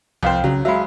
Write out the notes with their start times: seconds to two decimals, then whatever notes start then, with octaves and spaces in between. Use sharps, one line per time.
0.23 C2 F2 C5 F5 G5
0.44 C#3 F#3
0.65 F#3 G#3 E5 F5 B5